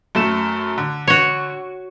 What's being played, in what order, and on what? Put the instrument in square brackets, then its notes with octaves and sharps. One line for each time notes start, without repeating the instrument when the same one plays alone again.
[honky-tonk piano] F#2 A3 E7
D3
[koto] F#4 C#5